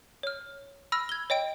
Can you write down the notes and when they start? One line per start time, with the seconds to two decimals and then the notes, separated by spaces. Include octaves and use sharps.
0.23 C#5 F6
0.92 B5 E6 F6 A#6
1.09 G#6 G7
1.30 C#5 D#5 G5 D7